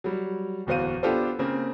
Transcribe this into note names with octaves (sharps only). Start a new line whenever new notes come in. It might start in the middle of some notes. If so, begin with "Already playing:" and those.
F#3 G3
D1 E2 F#4 C5 F5 D#7
B3 D4 F4 G4 A4 C5
C#3 A#3 C4